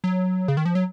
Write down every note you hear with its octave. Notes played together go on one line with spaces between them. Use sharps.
F#3
C#3
D#3
F3
F#3